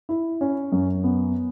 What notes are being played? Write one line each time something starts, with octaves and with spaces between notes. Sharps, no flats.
E4
C#4
F#2
B3